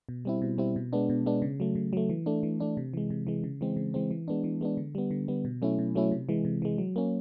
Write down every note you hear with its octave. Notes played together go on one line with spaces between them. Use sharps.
B2
G3 C4 E4
B2
G3 C4 E4
B2
G#3 B3 D4
B2
G#3 B3 D4
C#3
F#3 A3
C#3
F#3 A3
E3
A3 D4
E3
A3 D4
C3
E3 G#3
C3
E3 G#3
C#3
E3 G#3 C4
C#3
E3 G#3 C4
E3
G#3 B3 D4
E3
G#3 B3 D4
D3
G3 B3
D3
G3 B3
B2
F#3 A3 C#4 E4
B2
F#3 A3 C#4 E4
C3
E3 G#3
C3
E3 G#3
F#3
A#3 C#4